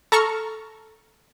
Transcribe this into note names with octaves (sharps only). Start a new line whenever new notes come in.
A4 A#5 C#6 F6